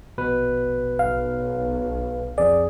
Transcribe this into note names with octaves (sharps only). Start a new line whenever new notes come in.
A#1 B2 B4
B1 F5
F2 G#4 D5